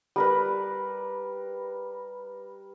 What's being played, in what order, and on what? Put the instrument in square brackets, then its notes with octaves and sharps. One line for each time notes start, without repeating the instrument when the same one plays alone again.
[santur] G3 A#4 B4